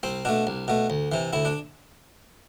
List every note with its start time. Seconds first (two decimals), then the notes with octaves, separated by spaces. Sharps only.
0.03 C2 C4
0.25 B2 A3 D4
0.47 C2
0.68 B2 A3
0.90 D2
1.12 C3 E3
1.33 D2 E4
1.45 D4